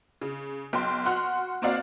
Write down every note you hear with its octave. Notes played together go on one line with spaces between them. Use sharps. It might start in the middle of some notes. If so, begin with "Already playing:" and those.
C#3
B1 G5 C6
F#4 F#5 C6 F6 F#6
A#3 C4 F#4 D5 F5